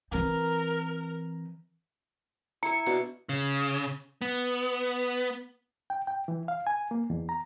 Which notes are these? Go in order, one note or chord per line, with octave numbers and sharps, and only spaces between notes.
E3 C4 A#4
E4 E5 A#5 C#7
B2 D4
C#3
B3
G5
G5
E3
F5
G#5
A#3
E2
A#5